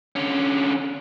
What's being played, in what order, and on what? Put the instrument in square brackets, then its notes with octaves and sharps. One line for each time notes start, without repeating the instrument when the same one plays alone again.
[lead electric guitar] D3 C#4